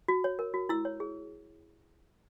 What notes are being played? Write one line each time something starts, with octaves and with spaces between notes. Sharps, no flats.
F#4
C#5
A#4
F#4
E4 E6
C#5
G#4